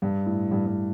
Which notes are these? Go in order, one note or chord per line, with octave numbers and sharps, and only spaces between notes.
G2
A2
G2
G2